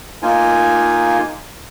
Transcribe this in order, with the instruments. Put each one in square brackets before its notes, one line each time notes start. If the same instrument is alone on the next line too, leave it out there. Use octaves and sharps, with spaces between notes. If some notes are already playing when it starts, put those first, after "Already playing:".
[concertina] A#3 D#4 F4 G#5